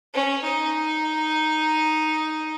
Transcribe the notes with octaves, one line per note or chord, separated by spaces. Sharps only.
C#4
D#4